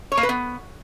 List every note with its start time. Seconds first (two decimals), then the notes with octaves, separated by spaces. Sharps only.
0.12 C#5
0.17 A#3
0.23 B4
0.29 B3